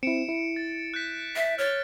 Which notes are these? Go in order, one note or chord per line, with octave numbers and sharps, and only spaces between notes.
C4 E4 C#7 D7 E7
E4
A6
F#6 G6 B6
E5
C#5 F6 A6